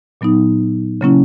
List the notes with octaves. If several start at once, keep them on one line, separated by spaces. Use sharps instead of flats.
A#2 F#3 B3 D#4
C#3 F#3 A#3 C#4 E4